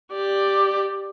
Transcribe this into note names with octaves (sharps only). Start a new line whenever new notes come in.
G4 D5